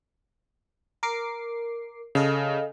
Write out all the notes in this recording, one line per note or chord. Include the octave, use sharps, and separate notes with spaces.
A#4 D6 C7
C#3 A4 D#5 F5